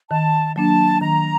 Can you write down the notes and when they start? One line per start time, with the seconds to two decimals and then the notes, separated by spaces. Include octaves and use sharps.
0.11 D#3 A5
0.56 F#3 A#3 D4 A5
1.01 D#3 A#5